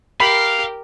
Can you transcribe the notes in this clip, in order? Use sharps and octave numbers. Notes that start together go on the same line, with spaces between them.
G4 A#4 F5 B5